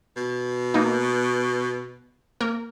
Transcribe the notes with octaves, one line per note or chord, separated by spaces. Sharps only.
B2
A#3 D#4
A#3 A#4